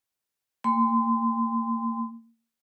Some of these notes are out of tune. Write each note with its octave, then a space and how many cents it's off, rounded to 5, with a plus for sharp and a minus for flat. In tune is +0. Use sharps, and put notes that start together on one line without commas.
A#3 -30 G5 +40 C6 -30